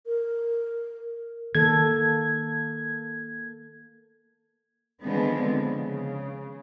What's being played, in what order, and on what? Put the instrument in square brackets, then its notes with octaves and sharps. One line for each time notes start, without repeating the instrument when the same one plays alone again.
[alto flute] A#4
[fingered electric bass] D#3 [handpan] A#3 A4 [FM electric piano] G#6
[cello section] D3 D#3 F3 G#3 B3 C4
C#3